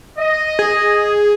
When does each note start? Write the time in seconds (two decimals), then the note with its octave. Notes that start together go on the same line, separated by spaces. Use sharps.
0.18 D#5
0.59 G#4